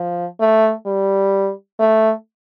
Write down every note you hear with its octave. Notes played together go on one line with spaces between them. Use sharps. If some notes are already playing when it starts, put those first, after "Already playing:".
Already playing: F3
A3
G3
A3